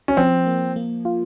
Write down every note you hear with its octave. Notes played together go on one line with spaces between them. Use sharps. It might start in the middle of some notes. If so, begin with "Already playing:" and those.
C#4
F3 C4
A#3
A#3
F4